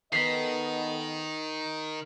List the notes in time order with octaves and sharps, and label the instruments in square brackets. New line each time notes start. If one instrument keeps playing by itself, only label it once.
[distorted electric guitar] D#3 [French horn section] B3 A4 D#5 [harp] B6 C7